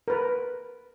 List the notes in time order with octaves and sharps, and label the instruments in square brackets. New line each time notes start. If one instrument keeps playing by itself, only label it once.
[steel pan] A#4 B4